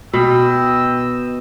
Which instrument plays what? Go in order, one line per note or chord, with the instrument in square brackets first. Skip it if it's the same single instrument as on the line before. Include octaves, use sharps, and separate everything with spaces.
[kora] B2 [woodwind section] D#5 G5 E6